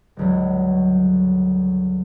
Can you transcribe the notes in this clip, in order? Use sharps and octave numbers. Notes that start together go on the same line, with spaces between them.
G1 C#2 F#3